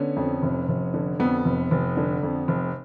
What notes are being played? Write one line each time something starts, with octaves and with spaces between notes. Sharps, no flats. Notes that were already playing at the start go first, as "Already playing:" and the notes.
Already playing: D3 B3 C#4
F2
F1
F1
D3
F2 B3
F1
F1
D3
F2
F1